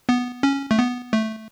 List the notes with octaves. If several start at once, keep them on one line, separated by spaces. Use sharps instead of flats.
B3
C#4
A3
B3
A3